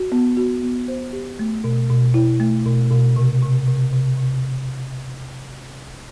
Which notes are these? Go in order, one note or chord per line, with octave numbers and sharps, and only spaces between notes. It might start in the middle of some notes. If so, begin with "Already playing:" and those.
Already playing: F#4
B3
F#4
B3
C5
G4
A3
B2
B2
E4
A3
B2
B2
C3
C3
C3
C3
C3